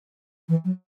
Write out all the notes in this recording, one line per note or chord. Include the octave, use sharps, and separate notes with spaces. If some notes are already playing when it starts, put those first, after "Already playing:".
E3
F#3